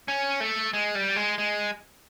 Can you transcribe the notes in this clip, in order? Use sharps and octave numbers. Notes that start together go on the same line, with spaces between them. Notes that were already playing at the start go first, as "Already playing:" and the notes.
C#4
A3
G#3
G3
G#3
G#3